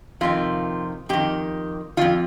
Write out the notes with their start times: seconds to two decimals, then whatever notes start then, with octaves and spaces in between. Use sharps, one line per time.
0.21 F2 C3 D#3 F4
1.09 F2 D#3 G4
1.97 D#3 F4
2.01 F2